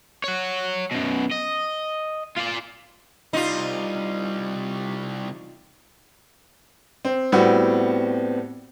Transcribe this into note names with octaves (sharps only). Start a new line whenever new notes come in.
C#5 F#5
F#2 B2
D#5
F4 D5
C2 G3 D#4 F4
C4
A2 G3 B3 C4 F#4